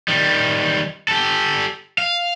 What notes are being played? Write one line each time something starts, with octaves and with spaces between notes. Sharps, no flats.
D#3 G3
G4 A4
F5